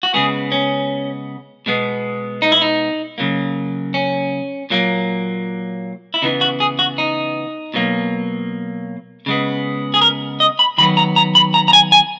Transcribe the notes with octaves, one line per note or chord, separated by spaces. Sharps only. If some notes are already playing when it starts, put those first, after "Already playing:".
F#4
C#3 G#3 B3 G#4
C#4
B2 G#3 B3
D#4
E4
D#4
C#3 F#3 A#3
C#4
A#2 F#3 A#3
E4
C#3 E3 B3 D#4
F#4
G#4
F#4
D#4
B2 F#3 A#3
C#3 G#3 B3
G#4
A#4
D#5
B5
D#3 F#3 B3 B5
A#5
A#5
B5
A#5
A#5
G#5
G#5